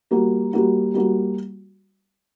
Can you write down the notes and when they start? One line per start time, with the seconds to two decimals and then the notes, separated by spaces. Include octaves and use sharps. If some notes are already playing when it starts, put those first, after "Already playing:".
0.11 G3 A#3 F#4
0.53 G3 A#3 F#4
0.94 G3 A#3 F#4